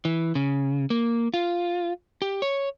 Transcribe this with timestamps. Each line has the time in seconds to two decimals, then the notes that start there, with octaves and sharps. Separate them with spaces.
0.05 E3
0.35 C#3
0.90 A#3
1.34 F4
2.22 G4
2.42 C#5